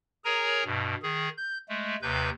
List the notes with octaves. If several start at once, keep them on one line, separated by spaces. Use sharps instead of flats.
G#4 A#4 C#5 G#5 A#5
G2 B2
D#3 G#4
G6
G#3 A3
D#2 C3 B4 G6